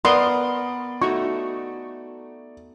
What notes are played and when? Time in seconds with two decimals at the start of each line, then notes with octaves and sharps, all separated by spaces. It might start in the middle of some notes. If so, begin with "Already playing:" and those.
0.05 B3 A#4 D5 C6 D#6
1.02 A3 D#4 F#4 C#6